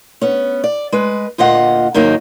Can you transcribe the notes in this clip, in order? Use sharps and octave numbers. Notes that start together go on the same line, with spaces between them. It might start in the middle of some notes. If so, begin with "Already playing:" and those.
B3 C#4
D5
G#3 B4
D2 A#2 F4 D#5 F#5
G#2 D#3 F#3 A#3 D#4